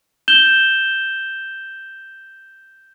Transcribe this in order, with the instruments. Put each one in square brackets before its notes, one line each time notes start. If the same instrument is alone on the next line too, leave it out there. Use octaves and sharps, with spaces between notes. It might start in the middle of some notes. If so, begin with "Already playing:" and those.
[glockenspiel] G6 E7 G7